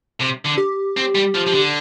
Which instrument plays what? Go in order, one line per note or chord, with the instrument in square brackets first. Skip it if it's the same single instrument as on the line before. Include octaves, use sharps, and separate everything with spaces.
[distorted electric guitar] C3
D3
[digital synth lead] G4
[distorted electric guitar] C4
G3
F3
F3
D3